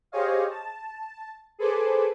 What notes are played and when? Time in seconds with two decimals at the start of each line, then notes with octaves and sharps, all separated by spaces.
0.12 G4 G#4 C5 C#5 D#5 F5
0.50 A5
1.59 G#4 A4 B4 C5 G#5 D6